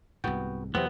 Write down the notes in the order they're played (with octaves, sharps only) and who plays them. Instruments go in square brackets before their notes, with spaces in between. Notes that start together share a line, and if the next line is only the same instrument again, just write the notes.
[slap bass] C2 G#2 [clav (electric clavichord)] B3 F#4 G5
[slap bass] E2 F#3 [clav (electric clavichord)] C3 C4 [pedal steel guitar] B3